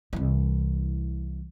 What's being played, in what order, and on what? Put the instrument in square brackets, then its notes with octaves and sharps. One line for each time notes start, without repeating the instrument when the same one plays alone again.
[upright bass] C2 E3